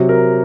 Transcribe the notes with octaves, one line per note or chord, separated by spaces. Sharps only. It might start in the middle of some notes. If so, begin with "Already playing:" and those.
Already playing: C3 F#3
A#4